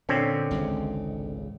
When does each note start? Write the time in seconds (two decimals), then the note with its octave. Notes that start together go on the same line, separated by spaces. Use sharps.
0.09 A#2 D3 C4 C#4
0.51 G#1 C#2 C#3